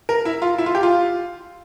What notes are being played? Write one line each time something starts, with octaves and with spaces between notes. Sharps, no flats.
A#4
E4
F4
E4
F4
G4
F4